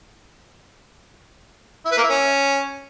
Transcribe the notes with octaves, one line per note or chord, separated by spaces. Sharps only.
E4
B4
A#3
E4
C#4